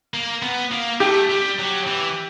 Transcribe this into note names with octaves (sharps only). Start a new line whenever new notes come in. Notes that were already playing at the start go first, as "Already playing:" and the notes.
A#3
B3
A#3
A3 G4
G3
F#3
E3